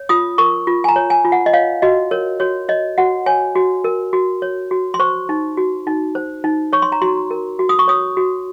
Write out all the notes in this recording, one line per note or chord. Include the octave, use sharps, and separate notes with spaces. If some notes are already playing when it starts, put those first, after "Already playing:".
Already playing: C#5
F4 D#6
A#4 C#6
F4
G#5
A#5
C#5
G#5
F4
F#5
D#5
C#5 F5
F#4 D#5
A#4 C#5
F#4 C#5
C#5 D#5
F#4 F#5
C#5 G#5
F#4
A#4
F#4
C#5
F#4
C6
C5 C#6
D#4
F#4
D#4
C5
D#4
C#5 C#6
C6
A#5
F#4 C6
A#4
F#4
D#6
C#6
C#5 D#6
F#4